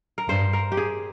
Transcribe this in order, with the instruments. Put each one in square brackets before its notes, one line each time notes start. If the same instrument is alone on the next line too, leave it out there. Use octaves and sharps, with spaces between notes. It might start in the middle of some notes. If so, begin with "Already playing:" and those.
[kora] A#4
[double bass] G2 [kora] C5
[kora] A#4
G4
G#4